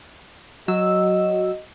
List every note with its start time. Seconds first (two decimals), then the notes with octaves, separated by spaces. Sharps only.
0.68 F#3 F#4 D#5 E6